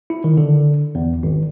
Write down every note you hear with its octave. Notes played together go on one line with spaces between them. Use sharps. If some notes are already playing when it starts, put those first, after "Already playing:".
E4
D#3
D3
E2
G#1